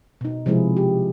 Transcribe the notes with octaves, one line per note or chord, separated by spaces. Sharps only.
B2 D#4
C3 F3 G#3 E4 F4 G#4
G4